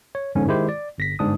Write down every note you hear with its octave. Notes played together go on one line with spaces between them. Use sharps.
C#5
G1 F2 G#2 D3 C#4
D#3 G#3 E4 G4 C5
D5
G1 A#6 B6
G1 G#2 D4 D#6